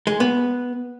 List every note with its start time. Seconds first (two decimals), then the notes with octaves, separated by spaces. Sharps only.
0.07 G#3
0.20 B3